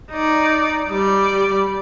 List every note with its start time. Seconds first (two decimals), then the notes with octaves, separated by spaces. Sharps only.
0.12 D#4 D5
0.90 G3 D5